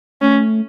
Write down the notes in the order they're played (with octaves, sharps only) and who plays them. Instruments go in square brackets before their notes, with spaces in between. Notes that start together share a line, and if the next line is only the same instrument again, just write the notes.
[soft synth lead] A3 [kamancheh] C#4